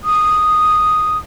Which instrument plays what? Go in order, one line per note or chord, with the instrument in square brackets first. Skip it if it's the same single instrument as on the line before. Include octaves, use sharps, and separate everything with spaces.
[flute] D#6